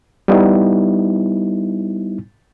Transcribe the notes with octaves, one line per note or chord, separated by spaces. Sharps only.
G3 B3 D#4 E4